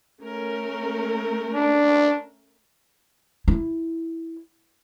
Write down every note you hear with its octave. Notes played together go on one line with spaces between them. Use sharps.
A3 C#4 A#4
D4
E4